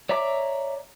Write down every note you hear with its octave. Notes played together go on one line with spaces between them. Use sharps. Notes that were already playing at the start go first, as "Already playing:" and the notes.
C#5 D5 E5 A#5 D6